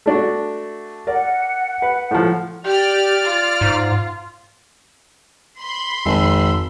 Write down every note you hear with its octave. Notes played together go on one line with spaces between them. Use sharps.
A3 D4 F#4
A#4 D5 F#5
B4
A2 F3
G4 D5 F6
F4
G#2
B5 C6
G#1 F2 E6